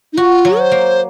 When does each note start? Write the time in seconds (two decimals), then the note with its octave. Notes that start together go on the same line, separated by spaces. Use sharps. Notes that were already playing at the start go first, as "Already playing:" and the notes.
0.13 D#4
0.17 F4 F#4
0.45 F#3
0.59 C5
0.72 A#3